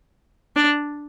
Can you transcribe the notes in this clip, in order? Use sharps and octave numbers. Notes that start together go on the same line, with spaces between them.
D4